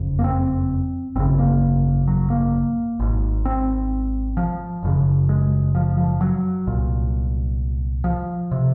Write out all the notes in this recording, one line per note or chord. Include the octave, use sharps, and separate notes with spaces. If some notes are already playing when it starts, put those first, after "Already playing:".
Already playing: F#1 F2 C#3
A#3
C4
G#1 F#2 C#3 C4
A#3
F#3
A#3
G#1 G#2
C4
F3
F#1 F#2 C#3
G#3
F3
F3
F#3
C2 A#2
F3
C3